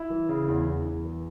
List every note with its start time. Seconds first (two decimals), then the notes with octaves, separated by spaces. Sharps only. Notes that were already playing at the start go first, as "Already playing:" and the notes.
Already playing: E4
0.10 E3
0.29 C#3
0.48 E2
0.66 E2
0.86 E2
1.05 E3